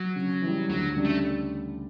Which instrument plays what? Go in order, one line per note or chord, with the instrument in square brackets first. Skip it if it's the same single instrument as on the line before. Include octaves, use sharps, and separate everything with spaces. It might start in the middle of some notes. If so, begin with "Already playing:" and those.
Already playing: [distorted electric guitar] F#3
[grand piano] C#3
E3 G3
[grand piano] D2 [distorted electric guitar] F#3
[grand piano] C#3 G3 D4
[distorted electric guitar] A3